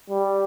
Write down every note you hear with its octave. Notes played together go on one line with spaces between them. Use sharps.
G3